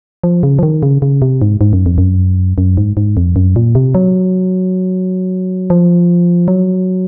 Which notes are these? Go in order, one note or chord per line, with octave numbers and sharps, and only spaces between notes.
F3
C#3
F3
D#3
C#3
C#3
C3
G#2
G#2
F#2
F2
F#2
F#2
G#2
G#2
F2
F#2
A#2
C3
F#3
F3
F#3